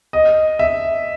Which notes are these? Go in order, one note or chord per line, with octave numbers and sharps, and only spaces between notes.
D#5
E5